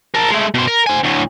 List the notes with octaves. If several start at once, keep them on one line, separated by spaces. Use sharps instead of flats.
A#4 A5
G#3 A3
B2 C5
A#4
C5 G#5
D2 A2